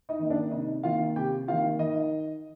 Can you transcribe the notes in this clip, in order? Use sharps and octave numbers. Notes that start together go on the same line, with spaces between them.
D#4 D#5
D#3 A#3
D4 D5
C3 D#4 D#5
D#3 A#3 F4 F5
C3 G4 G5
D#3 A#3 F4 F5
D#3 D#4 D#5